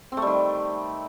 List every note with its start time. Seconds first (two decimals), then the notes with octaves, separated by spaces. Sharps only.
0.12 C4
0.17 A3
0.22 G3
0.27 D#3